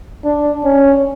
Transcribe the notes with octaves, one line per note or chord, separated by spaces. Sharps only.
D4
C#4